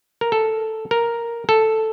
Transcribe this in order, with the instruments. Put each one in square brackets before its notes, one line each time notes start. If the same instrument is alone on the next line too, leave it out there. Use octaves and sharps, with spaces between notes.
[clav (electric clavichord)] A#4
A4
A#4
A4